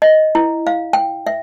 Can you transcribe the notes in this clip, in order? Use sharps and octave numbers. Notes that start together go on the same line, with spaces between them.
D#5
E4
F5
G5
E5